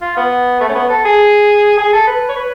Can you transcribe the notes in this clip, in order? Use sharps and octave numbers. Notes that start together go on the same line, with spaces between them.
F4
B3
A3
C#4
B3
A4
G#4
G#4
A4
B4
C#5
B4